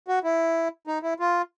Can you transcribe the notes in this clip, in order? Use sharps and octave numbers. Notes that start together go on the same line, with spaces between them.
F#4
E4
D#4
E4
F4